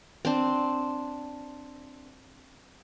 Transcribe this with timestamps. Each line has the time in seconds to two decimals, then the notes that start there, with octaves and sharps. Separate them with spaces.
0.25 C4 D4